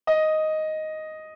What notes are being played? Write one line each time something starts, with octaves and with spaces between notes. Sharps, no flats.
D#5